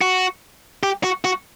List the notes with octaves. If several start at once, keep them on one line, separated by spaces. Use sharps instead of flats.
F#4
G4
F#4
F#4